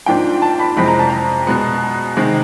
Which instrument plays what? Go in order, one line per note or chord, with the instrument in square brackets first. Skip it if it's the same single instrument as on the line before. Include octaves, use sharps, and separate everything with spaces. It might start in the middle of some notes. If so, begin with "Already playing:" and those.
[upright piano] G#2 F3 A#3 D4 [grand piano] G5
[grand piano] A5
B5
[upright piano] F2 C3 E3 G#3 C4 [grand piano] B5
[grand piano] A#5
A5
A#5
[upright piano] B2 G#3 B3
C3 D#3 G#3